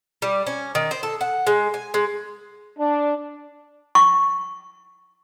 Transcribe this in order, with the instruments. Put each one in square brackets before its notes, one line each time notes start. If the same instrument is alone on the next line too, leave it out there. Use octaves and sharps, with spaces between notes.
[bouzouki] G3
C#4
D#3
C5
A4
F#5
G#3
G#5
G#3
[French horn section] D4
[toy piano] C#6